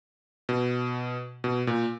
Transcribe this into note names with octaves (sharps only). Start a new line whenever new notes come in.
B2
B2
A#2